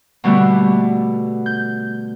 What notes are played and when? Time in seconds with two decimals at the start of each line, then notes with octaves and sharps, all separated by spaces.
0.24 B2 D3 G3 A3 B3
1.46 G6